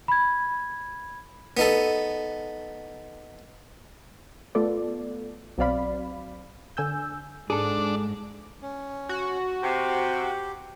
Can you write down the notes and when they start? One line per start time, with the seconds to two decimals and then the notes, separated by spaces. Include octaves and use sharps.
0.08 B5 G#6
1.57 B3 D#4 A4
4.55 A3 B3 F4 A4 D5
5.58 B1 F#3 C4 D5 F5 B5
6.77 D3 G#5 E6 G6
7.50 G#2 D4 G#4 A4
8.62 C#4
9.09 F#4
9.62 C3 G4